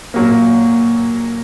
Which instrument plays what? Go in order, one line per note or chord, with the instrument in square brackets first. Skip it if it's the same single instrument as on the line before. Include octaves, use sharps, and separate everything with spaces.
[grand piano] A#2 F#3 A#3